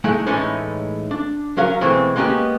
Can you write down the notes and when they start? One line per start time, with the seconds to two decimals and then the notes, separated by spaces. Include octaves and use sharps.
0.04 G#3 A3 D#4 E4 F#5
0.26 A2 E3 G#3 A3 C#4 D#4
1.11 D4
1.57 F#3 C#4 A#4 F5
1.81 B2 E3 G#3 A3 C4
2.16 G#3 A#3 B3 C#4 G4 D#5